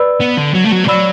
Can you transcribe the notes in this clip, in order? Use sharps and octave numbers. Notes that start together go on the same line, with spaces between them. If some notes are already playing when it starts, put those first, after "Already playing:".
Already playing: B4 D5 B5 E6
B3
D3
F#3
A3
F#3
A3
F#3 D5 B5 E6